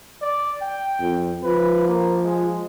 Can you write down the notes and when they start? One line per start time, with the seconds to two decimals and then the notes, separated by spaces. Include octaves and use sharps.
0.22 D5
0.62 G5
1.00 F2
1.43 F3 B4
1.88 A#3
2.24 G#3